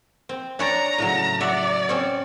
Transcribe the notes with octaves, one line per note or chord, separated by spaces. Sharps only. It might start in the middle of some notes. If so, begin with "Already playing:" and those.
C4
D4 C#5 D5 A#5
A2 C#3 F#3
F#3 D5 E5 F#5
C4 C#4 C#5